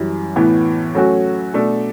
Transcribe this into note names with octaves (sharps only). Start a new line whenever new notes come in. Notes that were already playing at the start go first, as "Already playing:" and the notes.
Already playing: F#2 E3 G3
A2 E3 B3
F#3 A3 C#4 F#4
B2 A3 D4 A4